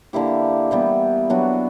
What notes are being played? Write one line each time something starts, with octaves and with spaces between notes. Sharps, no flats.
D3 A#3 E4 G4
E3 G3 B3
F#3 B3 D4 F#4